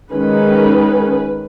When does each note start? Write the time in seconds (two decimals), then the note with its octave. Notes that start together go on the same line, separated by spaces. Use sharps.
0.11 D#3 G#3 C#4 B4